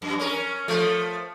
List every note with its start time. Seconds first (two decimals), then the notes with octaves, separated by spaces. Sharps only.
0.02 F#2
0.19 C#4 A#4
0.68 F3 A3